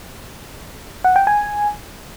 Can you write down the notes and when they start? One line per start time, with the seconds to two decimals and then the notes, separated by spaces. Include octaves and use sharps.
1.04 F#5
1.16 G5
1.27 G#5